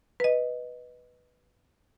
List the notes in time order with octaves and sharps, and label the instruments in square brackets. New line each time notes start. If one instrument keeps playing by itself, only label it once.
[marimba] B4 D#5